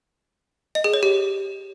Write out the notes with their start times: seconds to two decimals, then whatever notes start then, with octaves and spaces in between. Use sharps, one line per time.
0.75 D#5
0.84 G#4
0.94 C#5
1.03 G4